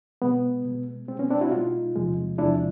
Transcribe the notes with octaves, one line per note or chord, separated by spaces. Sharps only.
B2 G#3 B3
B2 G#3
B2 G#3 C4
B3 C#4
C4 D4
E4 F#4
B2 G#3 D#4 F4
E2 C3 F3 G#3
E2 C3 F3 G#3 D4 E4